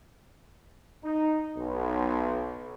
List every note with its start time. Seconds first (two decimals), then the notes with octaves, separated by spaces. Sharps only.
1.04 D#4
1.57 B1